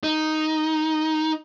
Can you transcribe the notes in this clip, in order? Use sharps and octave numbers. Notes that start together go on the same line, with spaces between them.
D#4